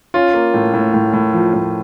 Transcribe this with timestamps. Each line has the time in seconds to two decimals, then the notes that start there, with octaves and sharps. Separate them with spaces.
0.14 C#4 F4
0.34 A#3
0.54 A2
0.74 A2
0.94 A2
1.13 A2
1.33 F3
1.54 A2